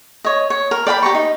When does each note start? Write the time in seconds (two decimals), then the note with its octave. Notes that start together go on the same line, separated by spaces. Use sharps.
0.24 C#5 D#5
0.50 C#5
0.71 A#4
0.87 D5 G5 A#5 B5
1.02 G4 A#5 C#6
1.15 D#4